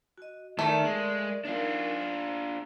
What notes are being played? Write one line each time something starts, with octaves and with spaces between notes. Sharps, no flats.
F#4 D#5
D#3 A3 A#4 D5 E5
G#3
D4 D#4 F4 A#4 C5
C5